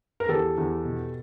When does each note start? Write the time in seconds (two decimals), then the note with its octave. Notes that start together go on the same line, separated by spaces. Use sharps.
0.20 A#4
0.28 E2 G4 A4
0.58 E2
0.85 B2